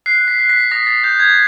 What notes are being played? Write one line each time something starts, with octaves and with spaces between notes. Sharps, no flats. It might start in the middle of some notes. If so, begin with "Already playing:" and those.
F#6 C7
B6
F#6
B6
D#6 A#6
A6
D#6 G6
G#6